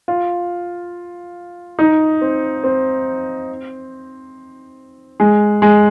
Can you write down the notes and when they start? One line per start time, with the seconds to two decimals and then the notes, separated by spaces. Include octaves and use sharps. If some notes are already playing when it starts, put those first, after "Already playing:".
0.08 F4
1.79 D#4
2.21 C4
2.64 C4
5.20 G#3
5.62 G#3